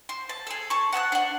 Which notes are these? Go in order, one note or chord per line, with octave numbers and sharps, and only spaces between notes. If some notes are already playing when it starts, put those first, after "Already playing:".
C5
A5
G#4 A4
A5 C#6
F#5 A5 D#6 F#6
D4 F#5